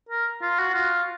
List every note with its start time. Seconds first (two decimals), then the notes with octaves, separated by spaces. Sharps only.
0.09 A#4
0.42 F4
0.59 F#4
0.74 F4